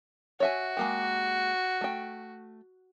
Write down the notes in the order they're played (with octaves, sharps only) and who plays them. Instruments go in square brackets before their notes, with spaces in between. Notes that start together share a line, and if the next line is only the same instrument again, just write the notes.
[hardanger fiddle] F#4 [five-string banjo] C#5 E5 G#5
[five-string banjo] G#3 A#3 G4
A3 G5